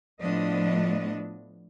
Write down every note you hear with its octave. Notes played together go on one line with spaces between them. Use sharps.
A2 F3 A3 B3 D4 D#5